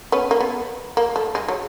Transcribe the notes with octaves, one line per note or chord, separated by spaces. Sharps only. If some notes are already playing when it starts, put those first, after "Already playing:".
B3 C#4
A#3
B3
A#3
A3
G#3
F#3